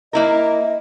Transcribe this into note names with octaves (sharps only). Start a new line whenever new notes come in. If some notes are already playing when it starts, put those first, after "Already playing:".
A#3 E4 A#4 D#5